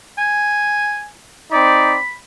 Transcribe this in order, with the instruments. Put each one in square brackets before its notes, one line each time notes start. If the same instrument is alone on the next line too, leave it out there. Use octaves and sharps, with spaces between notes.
[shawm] G#5
[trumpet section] C4 D#4 D5 [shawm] B5